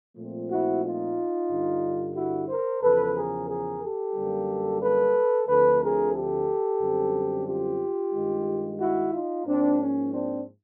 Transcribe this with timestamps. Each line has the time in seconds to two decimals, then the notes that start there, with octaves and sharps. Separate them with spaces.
0.16 A#2 F3 A3 C4
0.50 E4 F#4
0.83 D#4 F4
1.49 G2 D3 G3
2.15 E4 F#4
2.48 A#4 C5
2.81 E2 C#3 F3 A4 B4
3.15 G#4 A#4
3.48 G#4 A#4
3.81 G4 A4
4.15 F#2 D3 G3 A#3
4.81 A4 B4
5.47 D2 D3 F3 A3 C4 A4 B4
5.80 G#4 A#4
6.13 G4 A4
6.79 F#2 D3 G3 C4
7.46 F4 G4
8.12 G2 D#3 G#3
8.79 E4 F#4
9.12 D#4 F4
9.45 G#2 F3 A#3 C4 D4
9.79 C#4
10.11 C4 D4